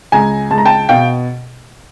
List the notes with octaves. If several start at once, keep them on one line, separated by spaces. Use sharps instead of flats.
C#2 G#5 A#5
C#2 A5
A#5
G5 A5
B2 F5 G5